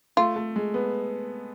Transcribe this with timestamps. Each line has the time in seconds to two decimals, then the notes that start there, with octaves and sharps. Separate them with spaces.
0.17 A3 F4
0.36 A3
0.56 G#3
0.74 B3